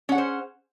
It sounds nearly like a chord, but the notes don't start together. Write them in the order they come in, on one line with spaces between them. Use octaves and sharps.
C#4 F#5 G#4 C5